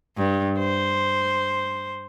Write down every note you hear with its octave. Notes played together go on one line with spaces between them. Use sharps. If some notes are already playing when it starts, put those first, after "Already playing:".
G2
C5